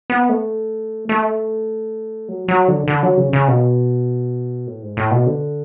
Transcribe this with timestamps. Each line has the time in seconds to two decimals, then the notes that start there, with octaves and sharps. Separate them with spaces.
0.10 B3
0.29 A3
1.09 A3
2.28 F#3
2.48 F#3
2.68 D3
2.88 D3
3.03 F#3
3.17 C#3
3.33 C#3
3.48 B2
4.67 A2
4.82 G#2
4.97 A2
5.11 B2
5.27 D3